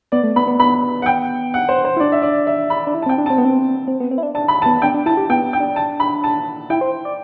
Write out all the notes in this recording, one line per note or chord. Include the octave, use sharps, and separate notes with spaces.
B3 D5
A3
B3 B5
B3
B3 B5
F#5
G5
F#5
C5
C5
E4
D4 D5
E5
D5
E5
B5
D4
E4
A5
C4 G5
D4
C4 A5
B3
C4
C4
B3
C4
E4
D4
D4 A5
B5
A5
B3
D4 G5
D4
E4 A5
G4
B3 G5
G5
D4
A5
B5
A5
E4 G5
C5
D5